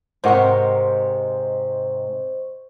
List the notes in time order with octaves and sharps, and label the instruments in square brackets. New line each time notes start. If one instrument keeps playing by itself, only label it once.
[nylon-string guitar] G#2 C3 [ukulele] G4 A#4 F#5 [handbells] C5 D#5 C#6